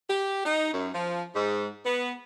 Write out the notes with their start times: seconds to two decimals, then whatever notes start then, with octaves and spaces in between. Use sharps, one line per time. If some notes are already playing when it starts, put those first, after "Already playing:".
0.09 G4
0.45 D#4
0.73 F#2
0.94 F3
1.35 G#2
1.84 B3